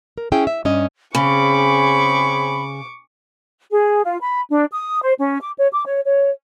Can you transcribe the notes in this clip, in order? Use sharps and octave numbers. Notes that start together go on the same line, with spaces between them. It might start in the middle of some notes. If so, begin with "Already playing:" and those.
A#4
C#4 E4 G#4 G5
E5
G2 C#4 C#5 D#5
C#3 C4 C#4 G#4 B5 C#6 D6
G#4
F4
B5
D4
D#6
C5
C#4
D6
C#5
D6
C#5
C#5